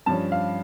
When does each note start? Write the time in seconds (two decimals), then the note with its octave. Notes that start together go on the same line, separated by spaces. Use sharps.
0.06 G2 F3 C#4 A5
0.32 F5